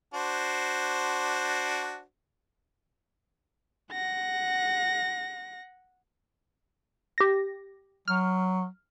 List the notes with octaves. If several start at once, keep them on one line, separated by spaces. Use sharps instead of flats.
D4 F#4 C5
F#5 A#6
G4 A#6
F#3 F6